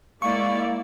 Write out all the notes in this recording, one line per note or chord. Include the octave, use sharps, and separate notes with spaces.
G#3 A#3 E4 D5 F5 C#6